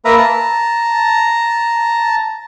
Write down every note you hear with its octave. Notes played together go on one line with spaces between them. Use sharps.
A#3 A#4 B4 E5 A#5
A5 A#5